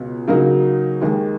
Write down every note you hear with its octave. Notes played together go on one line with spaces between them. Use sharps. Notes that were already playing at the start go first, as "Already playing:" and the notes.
Already playing: C#2 B2
C#3 F#3 A#3 D#4 F#4
D#2 D#3 G#3